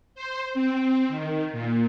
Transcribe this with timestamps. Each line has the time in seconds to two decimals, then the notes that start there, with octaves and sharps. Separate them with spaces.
0.15 C5
0.54 C4
1.08 D#3
1.52 A#2